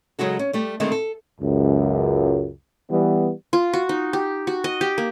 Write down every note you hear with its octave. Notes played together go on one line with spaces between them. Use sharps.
C#3 F#3 G#3 F#4 A4
C#4
G3 A3 G4
D3 D#3 G#3 A3 C4
A4
C#2 F#2
E3 G3 B3
F4
F#4
D#4
G4
F#4
D#5
G4
A#3